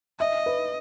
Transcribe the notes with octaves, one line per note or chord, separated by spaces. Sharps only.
D#5 E5
B4